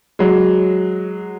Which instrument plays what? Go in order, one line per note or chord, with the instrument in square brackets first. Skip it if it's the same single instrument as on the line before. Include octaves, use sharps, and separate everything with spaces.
[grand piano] F#3 G#3